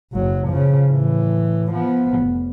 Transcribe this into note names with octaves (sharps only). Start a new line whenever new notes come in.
F#1 F#3
C#3 F3
A2 E3
F3 B3
F1